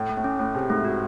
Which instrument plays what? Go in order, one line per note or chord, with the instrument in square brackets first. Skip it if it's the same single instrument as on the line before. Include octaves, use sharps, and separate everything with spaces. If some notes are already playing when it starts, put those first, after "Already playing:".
Already playing: [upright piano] A2
[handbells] A3
[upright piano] A2
[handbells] C#4
[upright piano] A2 [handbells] A3
[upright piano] C3 [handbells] G#4
[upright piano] G#2 [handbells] A3
[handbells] F#4